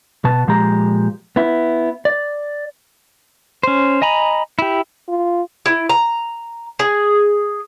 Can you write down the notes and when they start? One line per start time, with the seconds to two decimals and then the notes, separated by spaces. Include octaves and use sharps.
0.25 B2 B3 A5
0.47 A#2 F3 G#3 G4 A#5
1.36 B3 E4
2.05 D5
3.63 C#4 C5
4.02 D#5 G#5 A#5 B5
4.59 E4 G4
5.09 F4
5.66 E4
5.89 A#5
6.79 G#4